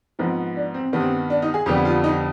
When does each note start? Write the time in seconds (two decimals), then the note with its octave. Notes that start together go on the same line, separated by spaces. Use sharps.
0.19 G#2 F3 B3 C4
0.56 D4
0.74 C4
0.93 G2 D#3 B3
1.00 C4
1.30 D4
1.42 D#4
1.54 G#4
1.66 F2 D3 G3 B3 G4
1.85 F4
2.04 D#4